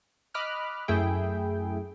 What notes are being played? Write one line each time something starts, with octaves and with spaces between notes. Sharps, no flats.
D#5 B5 D6 F6 F#6
F#2 A3 E4 G#4 G5